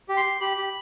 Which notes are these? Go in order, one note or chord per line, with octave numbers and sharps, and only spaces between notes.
G4
C6
G4
G4 B5
G4